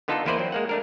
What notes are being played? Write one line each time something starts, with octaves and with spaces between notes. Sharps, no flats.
D3 B3 D#4 F4 A4
E2 A#3 E4 B4 C5 D5
F#3 C4
G#3 A#3 F#5
A3 D4 A#4